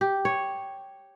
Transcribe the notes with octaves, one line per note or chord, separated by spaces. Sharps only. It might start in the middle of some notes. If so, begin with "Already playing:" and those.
G4
C#5